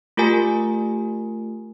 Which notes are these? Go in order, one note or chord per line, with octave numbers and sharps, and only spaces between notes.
A3 F4 G4 A#4 G#5